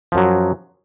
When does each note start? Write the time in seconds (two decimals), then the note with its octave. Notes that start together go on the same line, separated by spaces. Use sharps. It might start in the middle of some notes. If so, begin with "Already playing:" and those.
0.12 F3
0.15 F#2
0.17 F#3